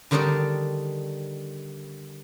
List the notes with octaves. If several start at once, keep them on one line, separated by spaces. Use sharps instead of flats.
D3 D#3 G3 D4 D#4 D5